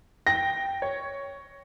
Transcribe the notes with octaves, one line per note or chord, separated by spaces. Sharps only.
G5 A#6
C#5